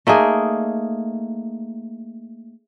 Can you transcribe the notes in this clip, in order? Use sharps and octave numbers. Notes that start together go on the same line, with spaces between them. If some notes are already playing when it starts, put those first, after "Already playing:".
A3 A#3 D#4 G#4